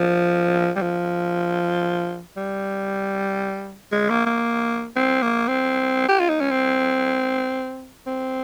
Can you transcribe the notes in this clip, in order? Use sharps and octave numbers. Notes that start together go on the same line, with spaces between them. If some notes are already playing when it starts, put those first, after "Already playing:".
Already playing: F3
G3
F3
G3
G#3
A#3
A#3
C4
A#3
C4
G4
F4
D#4
C#4
C4
C4